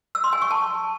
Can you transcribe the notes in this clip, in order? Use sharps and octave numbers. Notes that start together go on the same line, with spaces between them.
E6
C6
G#5
C#6
A5